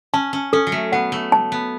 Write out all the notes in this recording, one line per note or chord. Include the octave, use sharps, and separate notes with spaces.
C#4 A5
C#4
C#4 A4
F#3
A3
B3 F#5
A3
A5
B3